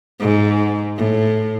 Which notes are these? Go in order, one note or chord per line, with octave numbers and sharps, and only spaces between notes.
G#2
A2